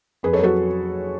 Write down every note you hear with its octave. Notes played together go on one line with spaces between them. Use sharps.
F2 G#4 B4
A4 C#5
F#3
F#4 A4